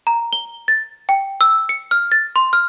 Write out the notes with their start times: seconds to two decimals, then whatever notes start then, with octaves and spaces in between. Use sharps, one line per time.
0.07 A#5
0.33 G7
0.68 A6
1.09 G5
1.41 E6
1.69 C#7
1.91 F6
2.12 A6
2.36 C6
2.53 F6